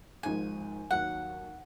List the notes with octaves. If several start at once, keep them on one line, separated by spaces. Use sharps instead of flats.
G#1 G#2 F3 G#3 D#4 G#5
D#2 D#3 F#3 F#5